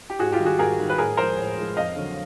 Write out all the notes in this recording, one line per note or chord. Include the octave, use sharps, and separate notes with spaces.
G4
G#2 F#4 G#4
F4 G4
D#3 G3
F#4 G#4
G#2 G#4 A#4
D#3 G3
B4
A2 G#4 A#4
F3 G#3 A#4 C5
A2
F3 G#3
F2 D#5 F5
D3 F#3